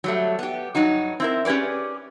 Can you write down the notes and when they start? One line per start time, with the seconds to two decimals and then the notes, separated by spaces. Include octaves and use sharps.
0.04 F#3 G3 A3
0.39 B3 G4
0.75 G2 F#3 D#4 F#4
1.20 C4 E4 A#4
1.45 C#4 G4 G#4 B4 D5